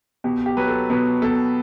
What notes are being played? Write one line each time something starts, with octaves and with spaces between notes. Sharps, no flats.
B2 G4
G4
F#3 B4
A4
B2 B4
B2 A4